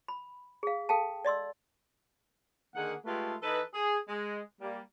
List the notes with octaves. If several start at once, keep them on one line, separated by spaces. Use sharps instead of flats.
B5
G#4 F5
A4 F5 G5 A5
D5 D#5 C6 E6
D3 D#3 A#3 G#4 F#5
G#3 A3 F4 G4 A4 B4
E3 D#4 A4 B4
G#4
G#3
G3 A#3